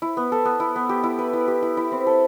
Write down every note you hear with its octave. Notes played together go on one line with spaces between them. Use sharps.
E4
B3
A4
B3
E4
B3
G4
E4
B4
E4
G4
E4
E4
C4
A4